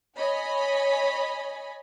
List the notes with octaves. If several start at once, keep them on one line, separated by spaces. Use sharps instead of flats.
C#5 D#5 G#5 B5